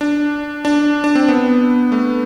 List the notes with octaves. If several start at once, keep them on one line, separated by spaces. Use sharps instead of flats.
D4
D4
D4
C4
B3
A3